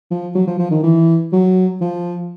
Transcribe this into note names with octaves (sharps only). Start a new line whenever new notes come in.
F3
F#3
F3
F3
D#3
E3
F#3
F3